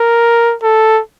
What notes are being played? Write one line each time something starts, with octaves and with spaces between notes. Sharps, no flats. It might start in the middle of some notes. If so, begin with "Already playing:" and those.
Already playing: A#4
A4